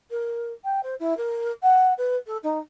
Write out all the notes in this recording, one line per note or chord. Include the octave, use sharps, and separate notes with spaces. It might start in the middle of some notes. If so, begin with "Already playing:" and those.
A#4
G5
C5
E4
A#4
F#5
B4
A4
D#4